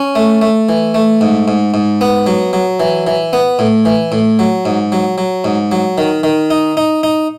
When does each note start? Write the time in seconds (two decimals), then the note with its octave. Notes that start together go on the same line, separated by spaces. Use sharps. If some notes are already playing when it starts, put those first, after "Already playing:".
Already playing: C#4
0.15 A3
0.41 A3
0.69 E3
0.94 A3
1.21 G#2
1.48 G#2
1.74 G#2
2.01 B3
2.26 F#3
2.53 F#3
2.80 E3
3.07 E3
3.33 B3
3.59 A2
3.85 E3
4.12 A2
4.39 F#3
4.65 G#2
4.92 F#3
5.18 F#3
5.44 G#2
5.72 F#3
5.98 D#3
6.23 D#3
6.50 D#4
6.77 D#4
7.03 D#4